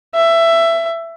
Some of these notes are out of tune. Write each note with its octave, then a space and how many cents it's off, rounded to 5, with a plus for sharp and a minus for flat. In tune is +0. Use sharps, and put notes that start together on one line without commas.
E5 +15